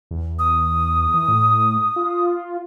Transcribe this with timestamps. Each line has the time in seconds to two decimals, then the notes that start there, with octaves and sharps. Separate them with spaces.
0.11 E2
0.39 D#6
1.14 E3
1.28 A2
1.96 F4